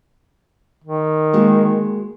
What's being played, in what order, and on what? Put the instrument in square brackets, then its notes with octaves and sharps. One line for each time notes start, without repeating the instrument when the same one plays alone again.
[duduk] D#3
[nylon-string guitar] G#3 A#3 F#4